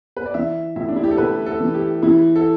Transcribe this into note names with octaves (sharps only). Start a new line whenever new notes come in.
B4
D5
E3 E5
A2 E5
D4
E4
G4
A4
A2 B4
A4
E3
G4
E3 E4
A4